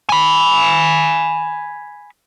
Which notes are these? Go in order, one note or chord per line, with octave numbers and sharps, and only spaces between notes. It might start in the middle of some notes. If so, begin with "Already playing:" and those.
G#5 B5